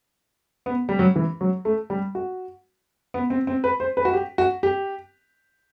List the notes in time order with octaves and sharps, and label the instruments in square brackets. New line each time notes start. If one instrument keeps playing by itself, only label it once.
[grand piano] B3
G3
F#3
E3
F#3
A3
G3
F#4
B3
C4
C4
B4
C5
B4
F#4
G4
F#4
G4